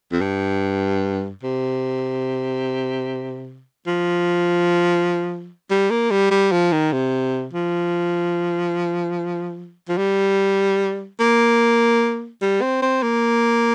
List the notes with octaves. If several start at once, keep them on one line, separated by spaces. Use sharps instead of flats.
F2
G2
C3
F3
G3
A#3
G3
G3
F3
D#3
C3
F3
F3
G3
A#3
G3
C4
C4
A#3